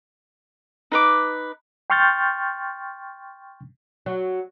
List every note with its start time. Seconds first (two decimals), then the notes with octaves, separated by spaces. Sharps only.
0.92 D#4 B4 D6
1.90 G5 C6 C#6 F6 G6 A6
4.06 F#3